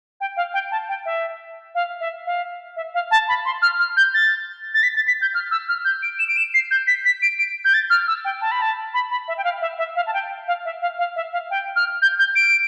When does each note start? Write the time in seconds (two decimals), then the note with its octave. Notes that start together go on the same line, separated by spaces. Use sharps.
0.21 G5
0.37 F5
0.54 G5
0.72 A5
0.89 G5
1.06 E5
1.75 F5
2.00 E5
2.26 F5
2.77 E5
2.94 F5
3.11 A5
3.28 B5
3.45 C6
3.62 F6
3.79 F6
3.97 G6
4.14 A6
4.74 A6
4.83 B6
4.96 A6
5.08 B6
5.22 G6
5.34 F6
5.51 E6
5.69 F6
5.85 G6
6.03 D7
6.19 E7
6.28 D7
6.37 E7
6.54 C7
6.71 G6
6.87 B6
7.05 B6
7.22 D7
7.39 D7
7.65 G6
7.74 A6
7.90 F6
8.08 E6
8.25 G5
8.41 A5
8.52 B5
8.62 A5
8.94 B5
9.11 B5
9.28 E5
9.38 G5
9.44 F5
9.62 E5
9.78 E5
9.96 F5
10.07 A5
10.14 G5
10.48 F5
10.65 E5
10.82 F5
10.99 F5
11.16 E5
11.33 F5
11.51 G5
11.76 F6
12.02 G6
12.19 G6
12.36 D7